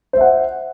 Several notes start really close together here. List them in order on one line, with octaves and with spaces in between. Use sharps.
C5 E5 F#5